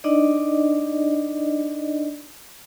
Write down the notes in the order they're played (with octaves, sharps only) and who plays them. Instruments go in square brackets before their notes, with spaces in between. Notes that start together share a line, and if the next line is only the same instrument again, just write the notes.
[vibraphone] D4 D#4 D5 D#5